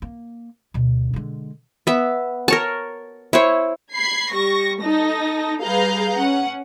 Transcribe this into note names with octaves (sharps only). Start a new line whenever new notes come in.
A#3
D2 B2
D3 G#3
B3 E5
A#4 C#5 A5
E4 C5 C#5
B5 G#6 C7
G3 C#6 A#6
D#4 A4 A#6
G3 G#4 B4 F5 A#5 G6
C#4 F#5